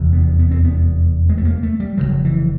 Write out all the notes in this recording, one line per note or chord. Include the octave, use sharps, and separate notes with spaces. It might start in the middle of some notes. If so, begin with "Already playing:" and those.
Already playing: F1 E2 C3
B3
B3
C4
B3
G#3
A3
A#3
A3
G3
F1 F2 C#3 F#3
E3